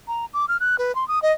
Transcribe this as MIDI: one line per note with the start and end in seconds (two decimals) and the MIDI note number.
0.08 0.25 82
0.33 0.45 86
0.48 0.57 89
0.60 0.76 90
0.78 0.94 71
0.95 1.07 84
1.08 1.22 87
1.22 1.32 75